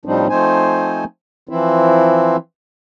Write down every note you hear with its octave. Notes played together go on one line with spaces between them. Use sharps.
A2 F3 G3 C4 D4 D#4
F3 A3 C4 D#4 C5 G#5
E3 F3 C4 E4